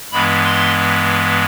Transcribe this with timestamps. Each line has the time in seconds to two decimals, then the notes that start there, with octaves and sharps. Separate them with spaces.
0.12 G2 E3 G#3 B3 B5
0.45 C6